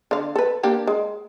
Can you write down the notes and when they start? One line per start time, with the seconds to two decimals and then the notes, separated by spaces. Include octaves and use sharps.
0.11 D3 F5
0.36 A4 B4
0.63 A#3 D4 G4
0.87 G#3